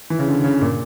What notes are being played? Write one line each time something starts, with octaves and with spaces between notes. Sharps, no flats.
E3
C#3
D3
C#3
A#2